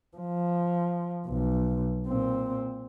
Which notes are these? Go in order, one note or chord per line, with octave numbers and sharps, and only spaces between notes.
F3
B1
A#2 C4